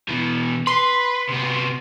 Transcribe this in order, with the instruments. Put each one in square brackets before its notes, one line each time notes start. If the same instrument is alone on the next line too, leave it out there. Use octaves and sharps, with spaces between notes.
[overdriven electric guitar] B2 E3
[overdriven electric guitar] B4 [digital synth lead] C6
[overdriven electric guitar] C3 B3